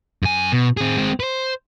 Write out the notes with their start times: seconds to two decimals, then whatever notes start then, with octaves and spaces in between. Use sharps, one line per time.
0.23 F#2 G#5
0.52 B2
0.77 C4 G#4
0.97 G#3 C4
1.20 B4 C5